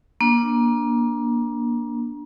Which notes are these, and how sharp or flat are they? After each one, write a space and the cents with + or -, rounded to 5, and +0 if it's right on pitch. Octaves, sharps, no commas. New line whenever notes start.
A#3 +25 D4 +0